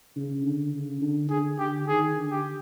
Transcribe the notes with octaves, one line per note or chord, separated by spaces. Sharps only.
C#3
D3
C#3
D3
D3 G#4
D3 G4
D#3 G#4
D3
G4